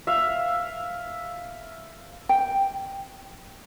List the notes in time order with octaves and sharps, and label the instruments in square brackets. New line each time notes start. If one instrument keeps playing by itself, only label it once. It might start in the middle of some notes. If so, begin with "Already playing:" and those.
[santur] E5 F5
[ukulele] G5